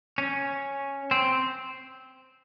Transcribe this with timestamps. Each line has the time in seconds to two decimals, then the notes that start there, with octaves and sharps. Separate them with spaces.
0.18 C#4
1.11 C4